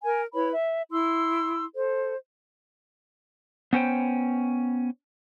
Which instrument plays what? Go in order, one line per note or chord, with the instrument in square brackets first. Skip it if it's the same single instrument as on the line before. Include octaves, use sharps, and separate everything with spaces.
[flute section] A#4 G#5
E4 B4 C#5 B5
E5
E4 C6 E6
A4 C5
[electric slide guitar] B3 C#4 C5 G5